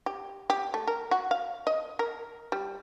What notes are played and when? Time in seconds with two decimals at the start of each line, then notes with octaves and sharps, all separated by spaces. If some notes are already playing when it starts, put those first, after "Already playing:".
0.06 G4
0.50 G4
0.74 A3
0.87 A#4
1.11 F#4
1.31 F5
1.67 D#5
1.99 A#4
2.52 G3